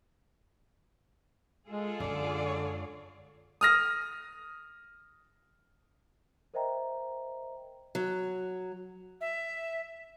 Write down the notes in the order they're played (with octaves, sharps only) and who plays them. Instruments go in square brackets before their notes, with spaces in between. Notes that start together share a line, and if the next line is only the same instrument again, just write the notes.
[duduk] G#3 [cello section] F4 G#4 A4
[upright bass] F#2 G#3 [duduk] D3 [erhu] D5
[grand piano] D#6 F6 A#6
[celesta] A#4 C5 D#5 E5 G5 A#5
[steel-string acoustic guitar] F#3
[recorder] E5